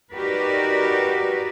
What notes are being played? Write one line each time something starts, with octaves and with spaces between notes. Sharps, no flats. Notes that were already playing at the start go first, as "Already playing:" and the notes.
D#4 F#4 G4 A#4 B4 D5